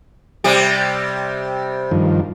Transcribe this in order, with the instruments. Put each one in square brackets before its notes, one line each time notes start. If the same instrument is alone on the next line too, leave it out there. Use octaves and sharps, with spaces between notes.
[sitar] C3 G3 G4
[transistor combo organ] G2 D#3 F3